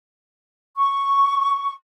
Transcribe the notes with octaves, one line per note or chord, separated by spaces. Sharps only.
C#6